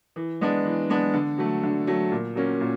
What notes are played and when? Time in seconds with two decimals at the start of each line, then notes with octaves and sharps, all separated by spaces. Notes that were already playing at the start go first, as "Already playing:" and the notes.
0.16 E3
0.41 G#3 B3 D4
0.65 E3
0.90 G#3 B3 D4
1.14 D3
1.38 F#3 A3
1.63 D3
1.87 F#3 A3
2.12 A#2
2.35 F#3 A#3 C#4
2.61 A#2